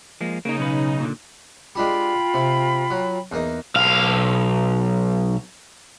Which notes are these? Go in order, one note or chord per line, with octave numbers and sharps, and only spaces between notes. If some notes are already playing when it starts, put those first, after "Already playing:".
F3 G#3 A#3
C#3 A#3 D#4
B1 C#4 B4
A#2 D3
G#3 D4 F4 G4 G5 B5
C3
F#3
E2 A#3 D#4
B1 F5